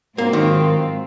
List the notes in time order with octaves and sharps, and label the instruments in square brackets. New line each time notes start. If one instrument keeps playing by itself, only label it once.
[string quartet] G#2 F#3 C4 F4 [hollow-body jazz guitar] A#3
[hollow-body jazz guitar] D#3